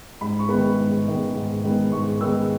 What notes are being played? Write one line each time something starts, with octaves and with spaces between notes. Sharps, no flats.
G#2 B5
C#6
D#3 G#3 B3 B5
G#2
D#3 G#3 B3
G#2
D#3 G#3 B3
G#2 C#6
D#3 G#3 B3 E6